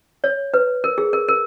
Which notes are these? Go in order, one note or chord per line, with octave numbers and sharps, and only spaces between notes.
C#5
B4
A#4
G#4
A#4
A#4